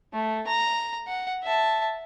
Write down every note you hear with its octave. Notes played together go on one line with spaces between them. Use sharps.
A3
A#5
F#5
E5 A5